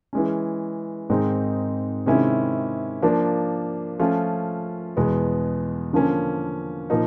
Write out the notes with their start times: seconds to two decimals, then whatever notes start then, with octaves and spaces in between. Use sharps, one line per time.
0.13 E3 G#3 C#4
1.10 G#2 D#3 G#3 C4 D#4
2.06 C3 D#3 G#3 C#4 E4
3.02 F3 A#3 D4
4.00 F3 A3 C#4 F4
4.97 E2 B2 G#3 B3
5.93 D3 F3 A#3 C#4
6.90 A#2 F3 A#3 D#4